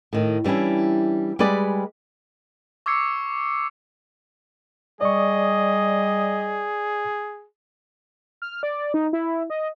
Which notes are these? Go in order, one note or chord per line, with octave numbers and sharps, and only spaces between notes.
A2 D#3
E3 G3 C#4 D4 E4
G3 G#3 G#4 B4 D5
C#6 D6 E6 G#6 C7 C#7
G3 G#4 D5 D#5 C#6
F6
D5
D#4
E4
D#5